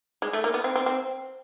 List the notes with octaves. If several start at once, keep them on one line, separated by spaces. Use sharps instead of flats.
G#3
A3
A#3
B3
C4
C4
C4